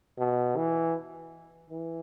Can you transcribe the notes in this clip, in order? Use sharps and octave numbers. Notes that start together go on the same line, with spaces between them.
B2
E3
E3